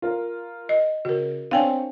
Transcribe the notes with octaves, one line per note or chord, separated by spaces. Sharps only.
F4 A#4
D#5
C#3 F#4 A#4
C4 D4 C#5 F5 G5 G#5